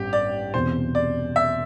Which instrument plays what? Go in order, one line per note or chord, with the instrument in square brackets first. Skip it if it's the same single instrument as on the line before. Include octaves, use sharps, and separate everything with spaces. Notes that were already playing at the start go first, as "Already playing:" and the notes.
Already playing: [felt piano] A1 G2 [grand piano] G4
[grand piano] D5
[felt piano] E1 E2 C3 [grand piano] C5
[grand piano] D5
E5